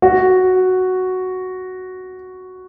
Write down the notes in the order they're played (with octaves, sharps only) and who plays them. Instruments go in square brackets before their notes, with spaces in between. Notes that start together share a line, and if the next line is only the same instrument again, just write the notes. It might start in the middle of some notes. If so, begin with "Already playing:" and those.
[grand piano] F#4